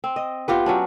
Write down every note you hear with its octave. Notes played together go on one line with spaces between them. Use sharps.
C4
D#5
B3 F4 G4 B4
F#3 C#4 D4